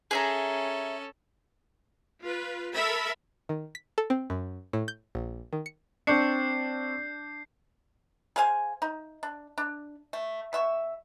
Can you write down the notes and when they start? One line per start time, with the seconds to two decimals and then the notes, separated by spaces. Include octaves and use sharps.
0.11 C#4 G#4 A4 E5 A#5
2.22 F4 B4
2.74 A4 A#4 E5 B5
3.49 D#3
3.75 B6
3.98 A4
4.10 C4
4.30 F#2
4.73 A2
4.88 G6
5.15 A#1
5.53 D#3
5.66 C#7
6.07 C4 D4 C#6 G6 C7 C#7
8.36 G#4 C5 F5 G#5
8.82 D#4
9.23 D4
9.58 D4
10.13 A3
10.53 B2 E5 C#6